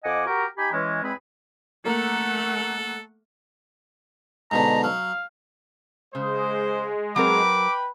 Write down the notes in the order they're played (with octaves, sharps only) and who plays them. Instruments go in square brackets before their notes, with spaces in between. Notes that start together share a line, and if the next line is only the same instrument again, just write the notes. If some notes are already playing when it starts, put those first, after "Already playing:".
[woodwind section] F2 D#5 F#5 G#5 D6
F#4 G4 A#4
D#4 G4 G5 G#5 B5
E3 G#3 C#4
E2 G#3 C4 G#4 B4 B5
[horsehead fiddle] A3 F#5 [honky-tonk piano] A#3 [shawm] A4
[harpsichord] G#2 B2 D3 [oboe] A#5
[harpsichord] F#3 [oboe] F5
[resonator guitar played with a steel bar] C#3 [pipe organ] G#3 [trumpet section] C5 D#6
[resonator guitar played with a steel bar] F#3 C4 A#4 [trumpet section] B4 G5 B5 [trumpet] D6